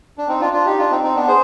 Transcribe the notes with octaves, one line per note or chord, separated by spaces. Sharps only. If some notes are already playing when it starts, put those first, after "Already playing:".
D4
C4 D#4
D4 F4
D4 F4
D#4 G4
D4 F4
C4 D#4
C4 D#4
B3 D4
G#4 C5